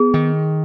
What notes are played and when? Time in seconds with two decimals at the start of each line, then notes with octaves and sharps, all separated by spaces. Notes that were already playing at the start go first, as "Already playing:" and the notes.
Already playing: B3 G#4
0.14 D#3